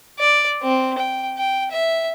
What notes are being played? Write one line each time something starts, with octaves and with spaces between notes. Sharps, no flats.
D5
C4
G5
G5
E5